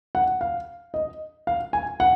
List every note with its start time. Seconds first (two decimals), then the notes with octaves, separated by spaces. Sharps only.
0.15 F#5
0.41 F5
0.94 D#5
1.47 F5
1.73 G#5
2.00 F#5